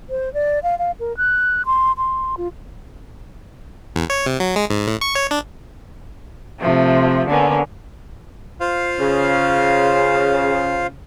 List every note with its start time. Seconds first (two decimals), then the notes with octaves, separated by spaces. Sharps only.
0.10 C5
0.34 D5
0.63 F5
0.79 F5
1.00 A#4
1.17 F#6
1.66 C6
1.97 C6
2.37 F4
3.96 E2
4.10 C#5
4.26 C3
4.40 F#3
4.56 G#3
4.70 G#2
4.87 A2
5.01 C#6
5.15 C#5
5.31 D4
6.60 C3 F3 A3
7.28 D3 A#3 B3 C#4
8.60 F4 C5 F5
9.00 C#3